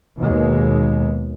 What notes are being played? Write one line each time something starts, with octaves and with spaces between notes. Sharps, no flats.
D#2 B2 G#3